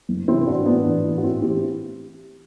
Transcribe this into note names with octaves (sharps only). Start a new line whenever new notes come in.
F#1
E2 C3 E3 C4 E4
A1 D4 F#4
A2 E3 B3 D4
A1
A2 E3
F#4
A1 C4 E4
A2 E3 E4 G4